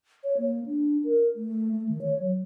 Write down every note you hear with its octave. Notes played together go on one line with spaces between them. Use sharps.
C#5
A#3
D4
A#4
A3
A3
D#3
C#5
F#3